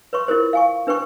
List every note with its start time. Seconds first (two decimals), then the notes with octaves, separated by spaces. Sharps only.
0.13 B4 C#5 C6 C#6
0.28 E4 F4 A#4 C5
0.53 F5 G#5 C#6
0.87 D4 B4 C5 G5 C#6